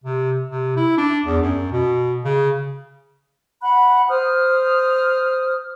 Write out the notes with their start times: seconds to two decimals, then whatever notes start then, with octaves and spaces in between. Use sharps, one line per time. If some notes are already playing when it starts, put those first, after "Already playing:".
0.04 C3
0.48 C3
0.77 E4
0.97 D4
1.25 E2
1.42 F#2
1.72 B2
2.24 C#3
3.61 F#5 B5 F#6
4.08 C5 D#6 F6